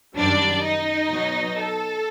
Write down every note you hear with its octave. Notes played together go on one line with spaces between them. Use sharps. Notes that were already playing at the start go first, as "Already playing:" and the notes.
F#2 D#3 G3 D4 D5
D#4 D#5
B2 F#3
A4